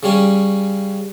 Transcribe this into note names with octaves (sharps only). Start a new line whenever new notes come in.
C#3 G3 C#4